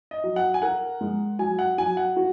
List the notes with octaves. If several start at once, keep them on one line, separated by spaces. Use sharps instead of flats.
D#5
F#3
F#5
G#5
A#4 F#5
G#3
F#3 G#5
F#5
F#3 G#5
F#5
F#4